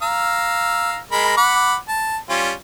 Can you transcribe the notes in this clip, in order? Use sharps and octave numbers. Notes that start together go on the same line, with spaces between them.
F5 A#5 E6
G#3 A#4 B5
F#5 B5 D6
A5
G3 C#4 F4